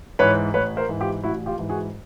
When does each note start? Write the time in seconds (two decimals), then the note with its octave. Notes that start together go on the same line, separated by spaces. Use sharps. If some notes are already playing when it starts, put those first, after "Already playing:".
0.19 G#2 E3 B4 C#5
0.54 A1 B4 C#5
0.77 A#4 C5
0.89 G#2 E3
1.00 F4 G4
1.23 A1 E4 F#4
1.46 F4 G4
1.58 G#2 E3
1.69 F#4 G#4